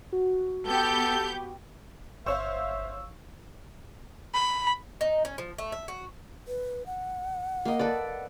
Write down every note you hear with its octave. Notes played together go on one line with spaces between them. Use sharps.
F#4
B3 G4 A4 G6
G1 C5 C#5 E5 F5 C#6 E6
B5
D#4
C#4
F3
A3
E5
F#4
B4
F#5
A#3 D#5
A4 B4 D5